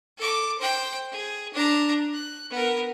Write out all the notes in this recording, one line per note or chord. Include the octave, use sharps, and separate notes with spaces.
A4 D6
C5 G5
G#4
D4 A#5
F#6
B3 A#4